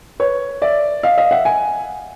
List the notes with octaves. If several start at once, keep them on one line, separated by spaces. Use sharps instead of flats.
B4 C#5
D5 E5
D#5 F5
D#5 F5
E5 F#5
F#5 G#5